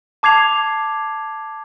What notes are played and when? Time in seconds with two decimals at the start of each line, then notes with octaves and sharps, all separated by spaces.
0.23 A5 D6 G#6 C7 F7